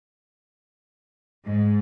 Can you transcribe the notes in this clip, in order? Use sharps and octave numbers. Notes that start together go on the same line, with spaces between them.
G#2